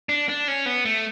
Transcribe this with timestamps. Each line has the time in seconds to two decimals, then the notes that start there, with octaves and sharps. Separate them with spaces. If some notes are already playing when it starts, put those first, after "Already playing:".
0.09 D4
0.29 D4
0.48 C#4
0.66 B3
0.85 A3